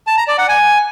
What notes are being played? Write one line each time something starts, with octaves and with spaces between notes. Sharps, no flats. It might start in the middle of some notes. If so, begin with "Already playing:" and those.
A5
A#5
D5
F#5
G#5